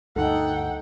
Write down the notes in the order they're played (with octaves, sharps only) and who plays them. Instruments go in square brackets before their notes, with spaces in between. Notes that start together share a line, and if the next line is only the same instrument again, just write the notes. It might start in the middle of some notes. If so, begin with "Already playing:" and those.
[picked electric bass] D2 G2 [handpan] D#4 A4 [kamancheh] F#5 G5